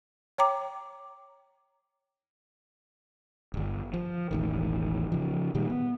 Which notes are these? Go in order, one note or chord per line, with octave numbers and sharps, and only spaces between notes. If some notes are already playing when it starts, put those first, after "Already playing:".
C#5 G5 A#5 D6
D1 G1
F3
E1 A1 D#3
C#3 F3
A#2 D#3 G3 G#3
B3